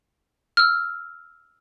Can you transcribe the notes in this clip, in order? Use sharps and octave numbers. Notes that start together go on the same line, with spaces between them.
E6 F6